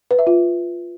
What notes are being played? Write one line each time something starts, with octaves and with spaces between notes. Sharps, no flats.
B4
E5
F4